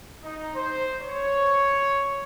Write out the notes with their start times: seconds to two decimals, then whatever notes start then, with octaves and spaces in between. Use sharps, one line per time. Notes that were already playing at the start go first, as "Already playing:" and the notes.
0.23 D#4
0.55 C5
1.01 C#5